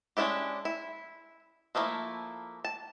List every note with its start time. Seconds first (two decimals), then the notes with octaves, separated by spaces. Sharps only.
0.17 G#3 C#4 D4 E4 G4
0.65 E4
1.75 F3 A3 A#3 E4
2.64 A5